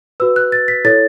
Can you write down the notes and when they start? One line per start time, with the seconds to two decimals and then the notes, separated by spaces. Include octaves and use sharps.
0.20 F#4 B4 E6
0.36 F#6
0.52 A6
0.68 B6
0.85 E4 A4 C#5 A6